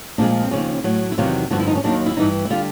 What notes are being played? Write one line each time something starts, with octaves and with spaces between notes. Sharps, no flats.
A#2 F3 G#3 D4
C4
D#2 C#3 F3 C#4
A2 F#3
E4
E2 C3 D#3 F#3 F4
G2 D3 F3 F#4
E4
D#4
C#4
D#2 D#3 F#3 D4
E4
G2 E3 G3 D#4
E4
D3 G3 F4